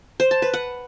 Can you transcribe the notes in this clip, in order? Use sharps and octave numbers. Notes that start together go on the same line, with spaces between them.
C5
A5
B4
F#5